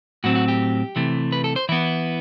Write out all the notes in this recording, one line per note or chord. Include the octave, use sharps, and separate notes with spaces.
A2 F#3 C4 F#4
F#4
G4
C3 E3 A3
B4
A4
C5
E3 B3 E4